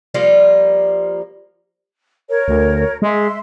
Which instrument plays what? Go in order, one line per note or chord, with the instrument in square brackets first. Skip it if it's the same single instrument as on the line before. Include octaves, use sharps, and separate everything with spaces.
[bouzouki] F3 G3 A#3 F4
[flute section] A#4 C#5
[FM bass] D2
[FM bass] G#3 [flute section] E5 C6